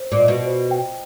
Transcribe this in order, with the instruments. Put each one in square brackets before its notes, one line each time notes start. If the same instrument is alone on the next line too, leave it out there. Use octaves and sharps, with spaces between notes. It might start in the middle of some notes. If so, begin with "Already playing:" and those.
Already playing: [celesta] C5
[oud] A#2
[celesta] D#5
[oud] B2
[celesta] C5
G5